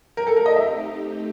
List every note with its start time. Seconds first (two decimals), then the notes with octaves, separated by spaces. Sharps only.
0.17 A#4
0.27 A3 C4 D#4 G4 A4
0.36 A#4
0.46 D#5
0.56 E5